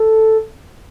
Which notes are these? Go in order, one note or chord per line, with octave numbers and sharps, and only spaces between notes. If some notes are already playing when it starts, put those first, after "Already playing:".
Already playing: A4